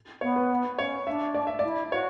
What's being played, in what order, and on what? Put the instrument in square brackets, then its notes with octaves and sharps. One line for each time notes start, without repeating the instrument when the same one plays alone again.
[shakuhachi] B3 [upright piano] C#5
[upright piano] B4
[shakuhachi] C#4 [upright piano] C#5
[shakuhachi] D4 [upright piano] E5
[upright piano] D5
E5
[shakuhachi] E4 [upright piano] D5
[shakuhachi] F#4 [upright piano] C#5